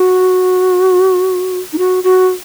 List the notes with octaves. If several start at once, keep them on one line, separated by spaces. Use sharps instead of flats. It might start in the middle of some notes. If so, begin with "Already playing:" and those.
Already playing: F#4
D#4
F#4
F#4